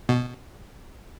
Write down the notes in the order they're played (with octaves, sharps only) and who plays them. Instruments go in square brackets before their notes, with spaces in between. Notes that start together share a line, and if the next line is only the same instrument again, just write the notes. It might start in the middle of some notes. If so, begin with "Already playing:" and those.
[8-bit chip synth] B2